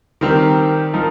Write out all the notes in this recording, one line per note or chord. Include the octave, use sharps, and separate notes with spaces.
D#3 G3 C4 G4 A#4
F3 D#4 A#4